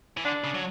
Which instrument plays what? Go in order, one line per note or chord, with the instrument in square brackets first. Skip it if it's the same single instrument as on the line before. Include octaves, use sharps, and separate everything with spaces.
[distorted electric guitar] E3
[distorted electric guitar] D3 [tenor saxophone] D4
[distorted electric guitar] C#3
F#3